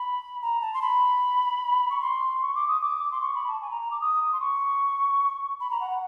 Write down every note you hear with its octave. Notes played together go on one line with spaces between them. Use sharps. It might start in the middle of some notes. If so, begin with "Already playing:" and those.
Already playing: B5
A#5
A5
C6
B5
C#6
C6
C#6
D6
D#6
D6
C6
C#6
B5
A5
G#5
A#5
A#5
D6
D#6
C6
C#6
B5
A#5
F#5
F#5